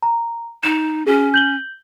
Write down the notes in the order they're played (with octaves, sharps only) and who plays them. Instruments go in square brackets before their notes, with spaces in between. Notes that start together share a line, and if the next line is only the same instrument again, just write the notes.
[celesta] A#5
[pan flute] D#4 [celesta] E7
[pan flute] C#4 [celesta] F#4 G#4
[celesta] G6 F#7 G7